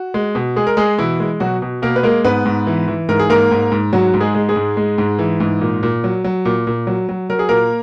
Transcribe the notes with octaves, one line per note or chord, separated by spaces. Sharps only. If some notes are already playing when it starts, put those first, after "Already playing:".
Already playing: F#4
G#3
B2
G#3 G#4
A#4
G#3 G#4
B2 E3 E4
G#3
B2 F#3 F#4
B2
B2 A#3 A#4
B4
G#3 A#3 A#4
G#2 B3 B4
G#2
E3
E3
G#2 A#4
G#4
G#2 A#3 A#4
G#2
G#2
G#2 F#3 F#4
G#2
G#3 G#4
G#3
G#3 G#4
G#2
G#3
G#2
E3
G#2
A#2
A#2
F#3
F#3
A#2
A#2
F#3
F#3
F#3 A#4
G#4
A#2 A#3 A#4